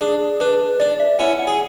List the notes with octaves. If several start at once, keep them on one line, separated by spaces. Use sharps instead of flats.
D4 G#4
D4 B4
D4 D5
E5
C#4 E4 F#5
F#5
G#4